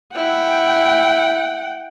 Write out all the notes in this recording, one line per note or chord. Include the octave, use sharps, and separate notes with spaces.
E4 F#5 G5